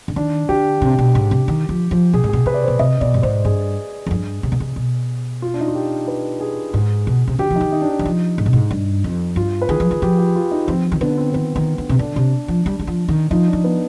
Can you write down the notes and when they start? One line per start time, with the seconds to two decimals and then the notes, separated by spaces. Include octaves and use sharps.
0.08 D3
0.16 D#3 D4
0.49 D3 G4
0.82 C3
0.99 B2
1.15 G#2
1.31 C3
1.48 D#3
1.69 F3
1.91 F3
2.13 B2 G#4
2.24 G#2
2.29 B2 G#4
2.46 C3 B4
2.54 D5
2.63 B2 C5
2.79 C3 D#5
3.01 B2 D5
3.14 G2
3.22 G#2 C5
3.45 G2 G#4
4.06 F2
4.11 G2
4.43 C3
4.52 B2
4.60 C3
4.76 B2
5.42 F4
5.54 D4
5.60 D#4
5.68 F4
5.75 G4
6.08 B4
6.41 G#4
6.74 G#2
7.07 B2
7.28 C3
7.39 D3 G4
7.51 F3
7.55 D#4
7.61 D#3
7.72 D#4
7.82 D4
7.89 D#4
7.99 D#3
8.05 F3
8.38 G#2
8.46 B2
8.53 G#2
8.71 G2
9.04 F2
9.36 G2 F4
9.62 B4
9.69 D#3 G#4
9.80 F3
9.91 D#3
10.02 F3 G4
10.19 G4
10.36 F4
10.51 D#4
10.67 F3 C4
10.85 C4
10.92 D#3
11.01 D3 B3
11.17 C4
11.34 D#3 B3
11.56 D#3
11.78 D3
11.89 C3
11.99 D3 D4
12.16 C3
12.48 F3
12.66 G3
12.79 G3
12.87 F3
13.09 D#3
13.31 F3 D#4
13.48 D4
13.53 F3
13.64 B3